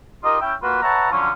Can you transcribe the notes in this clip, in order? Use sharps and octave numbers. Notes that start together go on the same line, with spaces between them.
D#4 F4 G4 A#4 D#5
C#4 E4 E5 G5
A#3 F4 F#4 B4
B4 C#5 E5 F#5 A5 A#5
D3 F3 F#3 C#4